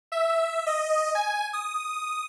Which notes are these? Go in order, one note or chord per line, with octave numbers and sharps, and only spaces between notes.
E5
D#5
G#5
D#6